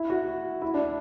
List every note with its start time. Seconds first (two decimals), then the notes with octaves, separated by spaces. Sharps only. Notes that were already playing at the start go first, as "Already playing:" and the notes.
Already playing: E4
0.10 F#4
0.62 E4
0.74 D4